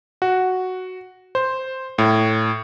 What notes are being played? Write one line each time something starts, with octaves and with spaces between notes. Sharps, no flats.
F#4
C5
A2